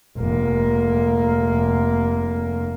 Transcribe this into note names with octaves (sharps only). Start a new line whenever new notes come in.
F1 A#3